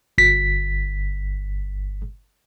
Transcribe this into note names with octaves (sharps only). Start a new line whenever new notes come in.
G1 B6